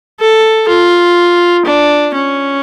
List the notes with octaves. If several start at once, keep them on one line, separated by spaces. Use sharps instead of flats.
A4
F4
D4
C#4